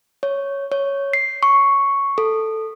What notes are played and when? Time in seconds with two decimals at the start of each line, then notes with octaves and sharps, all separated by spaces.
0.23 C#5
0.72 C#5
1.13 C7
1.43 C#6
2.18 A4